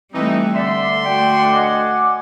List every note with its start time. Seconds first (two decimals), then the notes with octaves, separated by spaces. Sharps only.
0.14 E3 G3 A3 C4 D#4
0.56 D3 D5 E5 C6
1.05 A3 F#4 D5 G5
1.53 D#5 F#5 G#5 D6